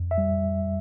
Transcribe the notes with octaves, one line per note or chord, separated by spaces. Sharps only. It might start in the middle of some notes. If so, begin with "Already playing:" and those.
Already playing: F2
E5
G3